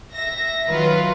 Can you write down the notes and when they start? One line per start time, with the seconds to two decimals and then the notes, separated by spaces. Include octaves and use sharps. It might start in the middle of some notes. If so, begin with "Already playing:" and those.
0.13 E5 A#6
0.68 D#3 F#3 F4 B4